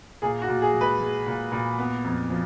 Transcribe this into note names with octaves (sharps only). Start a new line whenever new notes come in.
A#2 G#4
F#4
A#2
G#4
G#3
B4
G#3
A#2
A#2
B3
F2
F3